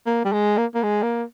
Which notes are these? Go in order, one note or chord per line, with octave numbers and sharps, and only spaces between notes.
A#3
G3
G#3
A#3
A#3
G#3
A#3